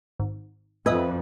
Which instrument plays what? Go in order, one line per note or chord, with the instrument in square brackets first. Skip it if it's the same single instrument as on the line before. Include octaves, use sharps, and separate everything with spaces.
[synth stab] G#1
[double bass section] F2 [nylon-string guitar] B4 [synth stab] D#5 E5 G#5